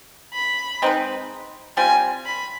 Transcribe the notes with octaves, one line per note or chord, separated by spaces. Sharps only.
B5
G#3 C4 D#4 B4
G3 C4 F4 G#5
B5